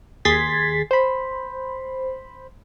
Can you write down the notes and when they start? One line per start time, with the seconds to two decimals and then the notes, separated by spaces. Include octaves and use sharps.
0.25 D#2 G#4 C6 G#6 A6 B6
0.91 C5 B5